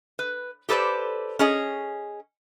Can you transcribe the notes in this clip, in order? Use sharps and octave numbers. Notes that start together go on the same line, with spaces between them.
B4
G4 A4 B4 C5 D5
C#4 G#4 D#5